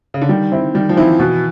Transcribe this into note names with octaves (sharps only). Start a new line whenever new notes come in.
C#3
D3
D#3 G3
C4 E4
D#3 G3
F3
E3 C4 E4
B2 E3